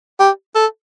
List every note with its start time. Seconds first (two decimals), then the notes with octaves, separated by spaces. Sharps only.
0.20 G4
0.55 A4